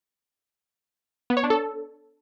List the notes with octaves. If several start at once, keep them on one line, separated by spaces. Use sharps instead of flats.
B3
C#5
D4
A4